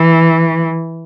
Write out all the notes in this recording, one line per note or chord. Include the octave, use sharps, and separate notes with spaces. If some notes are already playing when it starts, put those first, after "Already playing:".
Already playing: E3